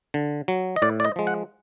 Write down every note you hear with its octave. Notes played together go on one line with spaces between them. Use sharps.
D3
F#3
D#5
A2 D5
D5
D#5
F3 G#3
F#5